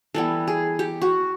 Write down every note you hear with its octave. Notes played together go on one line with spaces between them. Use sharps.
E3 G3 B3 A4
G#4
G4
F#4